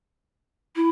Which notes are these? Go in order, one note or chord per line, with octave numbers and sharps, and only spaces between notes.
E4